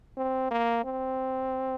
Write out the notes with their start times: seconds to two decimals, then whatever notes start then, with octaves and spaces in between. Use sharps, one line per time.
0.17 C4
0.51 A#3
0.84 C4